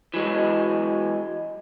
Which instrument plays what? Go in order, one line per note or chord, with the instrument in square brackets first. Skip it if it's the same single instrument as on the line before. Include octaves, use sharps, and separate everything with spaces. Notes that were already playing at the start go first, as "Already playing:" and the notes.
[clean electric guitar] E3 F#3 G#3